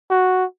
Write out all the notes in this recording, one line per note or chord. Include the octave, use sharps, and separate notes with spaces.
F#4